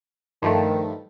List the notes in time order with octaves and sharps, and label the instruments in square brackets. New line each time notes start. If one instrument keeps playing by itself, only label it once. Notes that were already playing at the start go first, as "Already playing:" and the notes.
[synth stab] G2 F3 A3 [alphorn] D#3